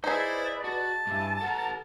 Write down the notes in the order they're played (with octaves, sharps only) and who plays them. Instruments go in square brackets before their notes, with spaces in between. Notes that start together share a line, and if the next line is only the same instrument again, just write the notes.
[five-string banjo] D#4 G#4 [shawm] E4 [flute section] B4 D5 [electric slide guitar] C5
[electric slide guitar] F#4 [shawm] A5
[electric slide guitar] G2 [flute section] E4 G#5
[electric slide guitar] A4 B4 [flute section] F#5 A#5